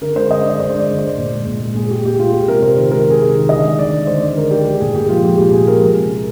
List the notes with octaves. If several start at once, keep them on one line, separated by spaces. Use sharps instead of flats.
D3 A#4
G#3 C5
D3 D#5
G#3 D5
D3 C5
G#3
D5
D3
G#3 C5
A#2
G#3
A#2
G#3
A#2 G#4
G#3 G4
A#2 G4
G#3 F4
G#3 G4
C3 A#4
C3 C5
D#3 C5
G#3 A#4
C3 G#4
C3
D#3
D3 D#5
G#3
D3 D5
G#3
D3 C5
G#3 D5
D3 A#4
G#3 G4
G#3 G4
A#2 G#4
A#2 G4
F3 F4
G#3 G4
A#2 G4
A#2 G#4
F3 A#4
G#3
C3
C3